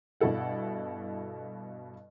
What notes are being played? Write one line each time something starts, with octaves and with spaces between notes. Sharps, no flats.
G2 B2 E4 A4 F#5